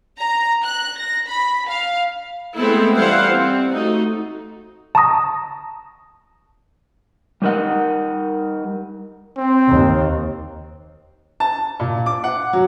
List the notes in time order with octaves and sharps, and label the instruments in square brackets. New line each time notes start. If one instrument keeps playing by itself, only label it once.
[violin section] A#5
F#6
A#6
B5
F5
[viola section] G#3 A3 B3 C4 E4 A4
E3 G3 E4 C5 F5 F#5
C4
A3 D#4 F#4
[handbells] A5 A#5 C#6 D#6 A#6
[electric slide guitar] G3 A3 D#4 A#4 D#5 F#5
[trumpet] C4
[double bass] D#2
[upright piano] A5
A#2
D6
F#5
F#3